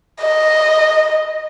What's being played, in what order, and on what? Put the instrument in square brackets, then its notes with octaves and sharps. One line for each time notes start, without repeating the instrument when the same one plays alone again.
[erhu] D#5